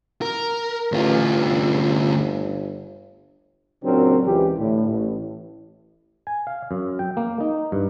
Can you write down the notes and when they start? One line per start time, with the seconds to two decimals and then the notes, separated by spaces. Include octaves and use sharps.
0.22 A#4
0.92 A1 D2 F4
1.32 G1
3.84 A#2 C#3 F#3 C4 D4 A#4
4.25 C#2 E3 G4
4.59 A2 D3
4.88 A1
6.27 G#5
6.47 F5
6.71 F#2
6.99 G5
7.17 A#3
7.41 D#4
7.72 G2